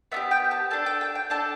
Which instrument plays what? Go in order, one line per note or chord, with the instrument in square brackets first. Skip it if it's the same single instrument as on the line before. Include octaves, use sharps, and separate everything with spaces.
[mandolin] B3 D4 G4 E5
G5
A5
D4 A4 A5
G5
G5
G5
D4 A4 A5